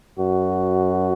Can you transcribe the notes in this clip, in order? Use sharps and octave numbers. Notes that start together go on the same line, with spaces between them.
F#2 F#4